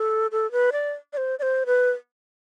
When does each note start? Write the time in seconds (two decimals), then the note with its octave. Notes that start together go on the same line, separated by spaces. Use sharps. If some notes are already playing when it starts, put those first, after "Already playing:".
Already playing: A4
0.32 A4
0.52 B4
0.72 D5
1.13 D5
1.17 C5
1.39 D5
1.42 C5
1.66 B4